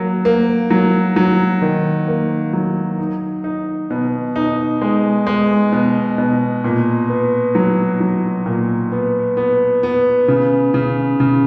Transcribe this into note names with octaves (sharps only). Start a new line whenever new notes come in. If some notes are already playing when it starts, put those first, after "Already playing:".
Already playing: F#3 A#3
A#3
F#3
F#3
D#3
A#3
F#3
D#4
D#4
B2
D#4
G#3
G#3
B2
B2
A#2
B3
F#3
F#3
A#2
B3
B3
B3
C#3
C#3
C#3